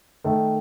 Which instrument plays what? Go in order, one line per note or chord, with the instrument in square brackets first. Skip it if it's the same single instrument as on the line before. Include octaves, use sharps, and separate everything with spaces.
[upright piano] D#3 [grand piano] A3